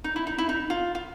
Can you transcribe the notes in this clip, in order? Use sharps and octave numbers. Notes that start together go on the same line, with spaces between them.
D#4
E4
D#4
E4
D#4
F4
F4